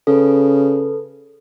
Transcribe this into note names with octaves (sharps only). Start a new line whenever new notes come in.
C#3 A4 B4